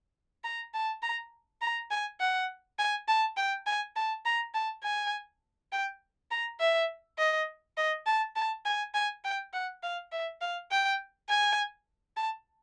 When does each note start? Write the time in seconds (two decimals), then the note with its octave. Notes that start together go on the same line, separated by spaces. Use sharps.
0.44 A#5
0.74 A5
1.02 A#5
1.61 A#5
1.91 G#5
2.20 F#5
2.79 G#5
3.08 A5
3.37 G5
3.66 G#5
3.96 A5
4.25 A#5
4.54 A5
4.83 G#5
5.72 G5
6.31 A#5
6.60 E5
7.18 D#5
7.77 D#5
8.06 A5
8.36 A5
8.65 G#5
8.94 G#5
9.24 G5
9.53 F#5
9.83 F5
10.12 E5
10.41 F5
10.71 G5
11.29 G#5
12.17 A5